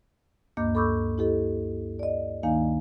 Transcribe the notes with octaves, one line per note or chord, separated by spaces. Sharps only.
D2 G2 A#3 D#5 D6 G6
A4 B5 C#6 D6 E6 G6
E4 G4 A4 D#5
D5 D#5
D2 D#3 A#3 D#4 F5 G#5